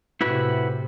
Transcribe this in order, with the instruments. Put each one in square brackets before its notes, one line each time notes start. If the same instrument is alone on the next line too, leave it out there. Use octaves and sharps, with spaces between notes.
[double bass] A2 C3 [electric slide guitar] E4 F#4 B4